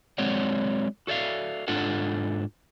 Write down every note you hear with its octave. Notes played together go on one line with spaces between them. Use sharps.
F#3 G#3 C4 C#5 D5 F#5
F#4 A4 D5 E5 F5
G#2 D4 F4 A4 F#5